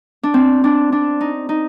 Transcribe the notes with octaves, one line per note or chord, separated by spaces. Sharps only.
D4
C4
D4
D4
D#4
D#4